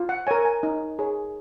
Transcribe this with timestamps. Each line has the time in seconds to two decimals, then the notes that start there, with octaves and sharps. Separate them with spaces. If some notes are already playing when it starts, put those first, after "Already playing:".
Already playing: F4
0.09 F#5
0.27 A#4 C#5 G#5
0.45 G#5
0.63 D#4
0.99 G#4 C#5